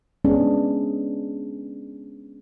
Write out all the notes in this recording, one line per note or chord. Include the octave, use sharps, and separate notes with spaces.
G#3 B3 C#4 D4 G#4